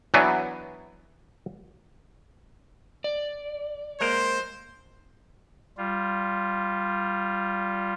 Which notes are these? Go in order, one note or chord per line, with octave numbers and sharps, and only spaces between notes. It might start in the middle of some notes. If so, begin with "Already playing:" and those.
E3 F#3 B3 D4 G#5
D5
G#3 A#3 A#4 C5
G3 F4